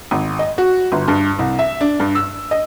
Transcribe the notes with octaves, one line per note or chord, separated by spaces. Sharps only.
G#1
D#5
F#4
G1
G2
C2
E5
D4
G2
E6
D#5